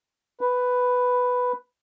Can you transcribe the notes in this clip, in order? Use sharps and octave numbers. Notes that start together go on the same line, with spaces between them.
B4